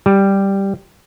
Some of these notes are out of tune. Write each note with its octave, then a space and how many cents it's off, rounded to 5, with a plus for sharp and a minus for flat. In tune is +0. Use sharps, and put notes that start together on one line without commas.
G3 +0